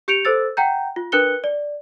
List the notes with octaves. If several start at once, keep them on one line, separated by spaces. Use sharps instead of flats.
G4 G6 C#7 D7 F7
A4 C5 E6 A6
F#5 G5 A#5 G6
F4
D4 A#4 B4 F#6 C#7 G7
D5